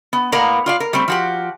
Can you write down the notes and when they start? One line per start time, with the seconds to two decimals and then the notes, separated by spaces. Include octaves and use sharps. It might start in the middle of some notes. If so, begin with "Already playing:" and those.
0.13 B3
0.32 A2 A#3 B3 A#4 D5 A#5
0.66 F4 D5 F5
0.80 A#4
0.93 G3 A3 C4
1.08 F3 F#4 G4